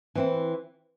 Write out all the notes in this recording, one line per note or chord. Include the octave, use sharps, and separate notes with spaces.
E3 C4 E4